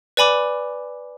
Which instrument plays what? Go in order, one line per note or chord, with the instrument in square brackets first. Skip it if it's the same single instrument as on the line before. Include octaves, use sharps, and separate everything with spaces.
[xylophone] B4 D5 G#5 B5 D6